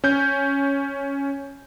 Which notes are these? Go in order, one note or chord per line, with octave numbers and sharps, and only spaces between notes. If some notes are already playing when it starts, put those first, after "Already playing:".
C#4 G6